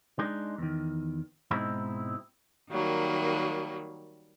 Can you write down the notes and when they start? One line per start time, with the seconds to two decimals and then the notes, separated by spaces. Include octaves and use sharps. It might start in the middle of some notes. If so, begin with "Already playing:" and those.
0.19 G#3 D4 D#4
0.58 E2 D#3
1.51 G#2 B2 G#3 C4 D#4 E4
2.70 D#3 F#3 G3 A#3